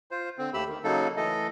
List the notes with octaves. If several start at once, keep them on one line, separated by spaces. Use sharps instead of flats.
F4 C5
D3 C4
D#2 A3 G4 B5 E6
D#3
C#3 F#3 A#3 D#4 A4
E3 A3 A4 D#5